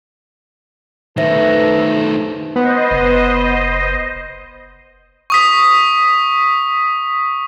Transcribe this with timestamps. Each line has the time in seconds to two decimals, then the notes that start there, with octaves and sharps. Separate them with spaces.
1.18 D#3 A3 A4 B4 C5 E5 A#6
2.56 B3 C5 D#5
2.91 F#1
5.30 C#6 D#6 B6